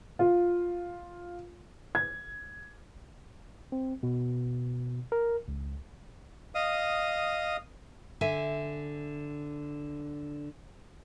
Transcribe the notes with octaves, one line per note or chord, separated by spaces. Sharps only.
F4
G#6
C4
B2
A#4
C#2
D#5 F5 D#6
D3 E5 G#5